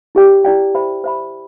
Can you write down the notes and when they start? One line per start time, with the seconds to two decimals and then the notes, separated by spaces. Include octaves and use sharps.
0.15 E4 G4 D5 G5
0.45 E4 G4 D5 G5
0.75 C5 E5 B5
1.04 C5 E5 B5